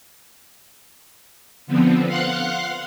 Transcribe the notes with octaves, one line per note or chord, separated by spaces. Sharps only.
D3 F3 B3 C4
F5 F#5 C6 F#6